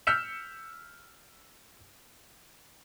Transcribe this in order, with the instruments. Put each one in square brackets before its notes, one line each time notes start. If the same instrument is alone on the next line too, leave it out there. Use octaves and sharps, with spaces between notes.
[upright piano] E6 F6 G6 B6 C#7 E7